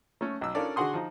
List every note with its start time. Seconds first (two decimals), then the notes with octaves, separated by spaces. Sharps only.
0.21 A3 C#4
0.41 B1 E6
0.55 C#4 D4 F4 A4 A#4 D5
0.76 D3 F#4 G#4 F#5 C6 D#6
0.94 F3 D#4